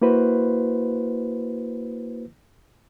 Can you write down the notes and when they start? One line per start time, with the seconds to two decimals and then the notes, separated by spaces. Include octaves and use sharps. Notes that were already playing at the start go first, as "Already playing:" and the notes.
0.02 A#3 E4 F#4 B4 C5